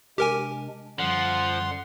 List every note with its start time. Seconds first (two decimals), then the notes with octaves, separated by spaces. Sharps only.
0.18 C3 G#3 D4 G4 A#4 G#5
0.99 F#2 D3 F3 G3 F#5 C6